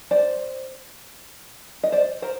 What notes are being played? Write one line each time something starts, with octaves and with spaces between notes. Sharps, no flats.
C5 D5
D#5
C5 D5
A#4 C5